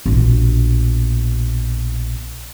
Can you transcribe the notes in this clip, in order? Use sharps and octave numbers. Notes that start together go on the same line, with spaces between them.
A#1 B2